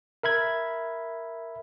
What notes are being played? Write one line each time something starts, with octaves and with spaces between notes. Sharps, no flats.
A#4 E5 B5 G#6